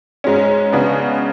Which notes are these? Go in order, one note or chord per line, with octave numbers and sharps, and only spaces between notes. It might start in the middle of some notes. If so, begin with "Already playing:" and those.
G#2 G#3 C#4
C#3 G#3 B3 D4